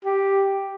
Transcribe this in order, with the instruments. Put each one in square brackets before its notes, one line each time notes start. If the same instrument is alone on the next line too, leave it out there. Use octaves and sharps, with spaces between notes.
[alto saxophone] G4